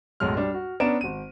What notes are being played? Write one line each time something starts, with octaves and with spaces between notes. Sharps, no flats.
B1 F#2 A2 G#3 F6
G3 D4
F#4
B3 C#4 D4 A#5 D7 E7
G#1 D#7